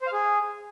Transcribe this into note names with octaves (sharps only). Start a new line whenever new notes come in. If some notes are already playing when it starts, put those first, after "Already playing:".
C5
F5
G#4